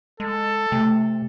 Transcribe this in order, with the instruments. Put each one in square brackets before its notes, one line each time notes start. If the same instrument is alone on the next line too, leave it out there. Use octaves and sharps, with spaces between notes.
[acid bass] G#3 [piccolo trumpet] A4
[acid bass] C3 [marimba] A3